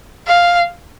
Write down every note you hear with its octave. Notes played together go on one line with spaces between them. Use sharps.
F5